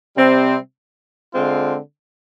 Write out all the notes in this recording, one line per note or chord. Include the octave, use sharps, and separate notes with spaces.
C3 G3 C4
D3 G#3 C4 F4